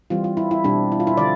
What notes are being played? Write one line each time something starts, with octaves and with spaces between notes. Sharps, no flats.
E3 G3 C4 F4
F4
E4
E4
B2 G3 C4 D4
E4
F4
E4
D3 F3 D5